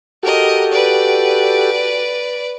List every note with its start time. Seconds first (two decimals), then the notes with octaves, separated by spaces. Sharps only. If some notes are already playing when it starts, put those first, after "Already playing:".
0.23 F#4 G4 A4 A#4 D#5
0.72 B4 D5